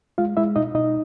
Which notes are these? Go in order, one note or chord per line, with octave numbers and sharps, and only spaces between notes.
G#3 F4 F5
G#3 E4 E5
B2 D#4 D#5
B2 D#4 D#5